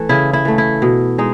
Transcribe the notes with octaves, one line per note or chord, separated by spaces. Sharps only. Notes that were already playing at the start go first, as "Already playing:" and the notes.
Already playing: E3 A3
C#3 E4
E4
E3 A3
E4
B2
G#3 D#4